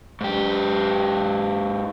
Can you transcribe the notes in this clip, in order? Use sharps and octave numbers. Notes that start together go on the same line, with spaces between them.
G#2 G4